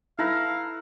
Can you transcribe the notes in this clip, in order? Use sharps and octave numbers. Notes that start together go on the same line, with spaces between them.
E4 A4 B4 F5 A#5